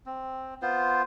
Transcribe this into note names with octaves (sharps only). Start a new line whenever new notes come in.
C4
B3 F4 C5